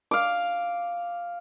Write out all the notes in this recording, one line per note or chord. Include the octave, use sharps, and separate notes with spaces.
F5 D6